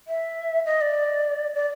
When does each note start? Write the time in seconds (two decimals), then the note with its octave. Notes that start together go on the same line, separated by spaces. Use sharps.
0.08 E5
0.66 D#5
0.81 D5
1.54 D5